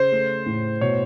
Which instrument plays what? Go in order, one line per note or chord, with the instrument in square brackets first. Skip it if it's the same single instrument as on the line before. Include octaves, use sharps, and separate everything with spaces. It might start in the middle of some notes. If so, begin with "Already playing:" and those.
Already playing: [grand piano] C#3 [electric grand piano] C5
[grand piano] A3
A2
[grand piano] B2 [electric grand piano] C#5